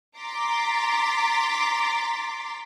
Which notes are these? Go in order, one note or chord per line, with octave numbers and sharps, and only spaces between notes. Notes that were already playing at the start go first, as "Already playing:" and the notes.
A#5 C6 D6 A6 B6